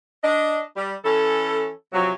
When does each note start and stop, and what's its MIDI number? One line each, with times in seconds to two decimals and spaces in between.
0.24 0.62 62
0.24 0.62 75
0.77 0.94 55
1.05 1.70 52
1.05 1.70 61
1.05 1.70 69
1.93 2.12 48
1.93 2.12 53
1.93 2.12 54